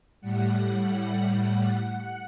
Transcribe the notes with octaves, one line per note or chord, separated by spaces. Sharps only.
A2 G3 F#5